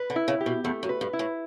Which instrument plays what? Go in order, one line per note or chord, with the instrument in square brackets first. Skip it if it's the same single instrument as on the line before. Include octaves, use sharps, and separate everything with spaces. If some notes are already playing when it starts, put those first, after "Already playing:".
Already playing: [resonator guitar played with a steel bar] B4
[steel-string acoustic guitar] D3
[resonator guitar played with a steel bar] E4
[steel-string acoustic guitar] C#3
[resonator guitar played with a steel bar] G4
[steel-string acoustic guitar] B2
[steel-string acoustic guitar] E2 [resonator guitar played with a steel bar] A3
[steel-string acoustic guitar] F#2
[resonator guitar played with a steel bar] B4
[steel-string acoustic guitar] G2
[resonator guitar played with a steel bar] E4
[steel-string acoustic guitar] A2